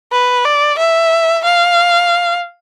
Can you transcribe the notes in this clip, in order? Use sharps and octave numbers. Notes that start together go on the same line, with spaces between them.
B4
D5
E5
F5